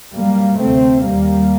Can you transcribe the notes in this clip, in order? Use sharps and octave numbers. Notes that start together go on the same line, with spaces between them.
F#2 G3 A#3
D2 C3 A3 C4
D#2 G3 A#3